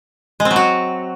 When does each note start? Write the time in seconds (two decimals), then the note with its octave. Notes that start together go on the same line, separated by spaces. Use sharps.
0.40 G#3
0.45 C4
0.51 F#3
0.56 F#4